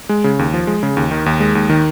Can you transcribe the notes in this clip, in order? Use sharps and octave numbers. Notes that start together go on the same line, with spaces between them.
G#3
C#3
D#2
F3
G#3
C#3
D#2
D#3
D#2
G#3
D#2
D#3